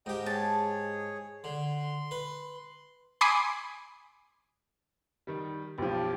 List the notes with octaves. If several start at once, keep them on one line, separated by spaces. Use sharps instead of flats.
G#2 G4 D#5 G5
G#4 C#5 A5
D3 C6
B4
G#5 B5 C6 D6 D#6 C7
D#3 G3
B1 F3 G4